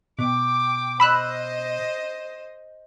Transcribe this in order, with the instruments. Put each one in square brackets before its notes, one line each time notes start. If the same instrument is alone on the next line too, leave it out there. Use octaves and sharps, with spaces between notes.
[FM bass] B2 [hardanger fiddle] G5 D6
[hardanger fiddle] C5 D#5 [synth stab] B5 E6 F#6